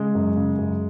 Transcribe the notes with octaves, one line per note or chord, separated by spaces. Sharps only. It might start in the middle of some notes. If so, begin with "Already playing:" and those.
Already playing: C#3 G#3
F#2
C#3
F#2